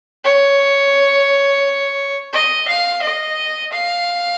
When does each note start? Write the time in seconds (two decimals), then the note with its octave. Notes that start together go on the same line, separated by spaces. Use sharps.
0.24 C#5
2.33 D#5
2.67 F5
3.02 D#5
3.72 F5